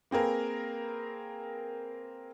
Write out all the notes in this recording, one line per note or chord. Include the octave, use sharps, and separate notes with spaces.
A#3 C4 G#4 A#4 B4